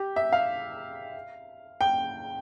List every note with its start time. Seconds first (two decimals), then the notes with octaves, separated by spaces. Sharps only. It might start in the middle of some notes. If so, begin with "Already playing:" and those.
Already playing: G4
0.16 E5
0.32 F5
1.81 G5